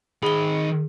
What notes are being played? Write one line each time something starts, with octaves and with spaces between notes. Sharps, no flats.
D#3 G#4 B5 G7